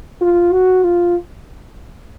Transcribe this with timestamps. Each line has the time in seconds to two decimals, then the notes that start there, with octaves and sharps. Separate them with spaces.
0.21 F4
0.52 F#4
0.83 F4